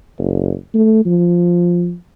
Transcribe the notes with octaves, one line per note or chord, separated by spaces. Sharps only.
F#1
A3
F3